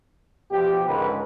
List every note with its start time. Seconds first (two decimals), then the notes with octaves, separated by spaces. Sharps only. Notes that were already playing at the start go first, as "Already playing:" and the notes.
0.51 B2 F3 G4
0.87 C#2 G#2 D3 A#4 B4